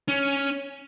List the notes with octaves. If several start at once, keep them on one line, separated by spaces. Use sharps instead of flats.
C#4